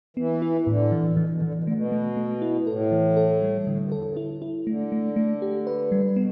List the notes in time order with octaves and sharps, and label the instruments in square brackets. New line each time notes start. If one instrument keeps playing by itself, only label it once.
[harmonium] E3 [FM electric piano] B3
[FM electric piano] E4
[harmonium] E3
[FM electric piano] A2 [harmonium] D3
[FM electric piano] E3
[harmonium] D3
[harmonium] B2 [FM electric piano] E3
[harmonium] B2
[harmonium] D3 [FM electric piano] E3
[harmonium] B2
[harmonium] D3 [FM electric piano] A3
[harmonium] B2
[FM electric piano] A3
A3
E4
[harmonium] A2 [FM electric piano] A4
[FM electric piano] E3
A4
G3
[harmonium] G2
[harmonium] A2 [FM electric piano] D3
[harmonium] G2
[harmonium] E2 [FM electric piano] A4
[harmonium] G2
[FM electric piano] E4
E4
[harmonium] D3 [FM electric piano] A3
[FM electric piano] A3
A3
G4
B4
G3
[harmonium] B2 [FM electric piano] B3